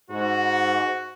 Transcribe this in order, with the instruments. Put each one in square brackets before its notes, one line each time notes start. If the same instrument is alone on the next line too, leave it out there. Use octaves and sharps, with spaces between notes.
[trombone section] G#2 [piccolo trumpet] F#4